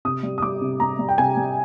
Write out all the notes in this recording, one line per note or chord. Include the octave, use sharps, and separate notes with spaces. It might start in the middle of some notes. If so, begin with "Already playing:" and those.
C3 D#6
G3
D#6
G3 D6
C3
G3 A#5
G3
G5
C3 G#5
G3